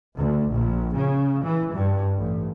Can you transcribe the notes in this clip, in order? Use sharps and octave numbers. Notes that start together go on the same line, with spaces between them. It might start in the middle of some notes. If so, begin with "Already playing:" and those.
D2
A#1
C#3
E3
G2
A1